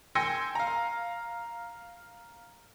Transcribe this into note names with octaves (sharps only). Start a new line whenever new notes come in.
G5 G#5 C6 E6 A#6 C#7
F5 A#5